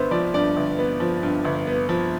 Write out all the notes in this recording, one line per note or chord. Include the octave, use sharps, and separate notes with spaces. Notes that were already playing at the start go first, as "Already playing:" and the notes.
Already playing: G1 G2 B3 C5 E5
F3 D5
G2 D5
G1
B3
F3
G2
G1
B3
F3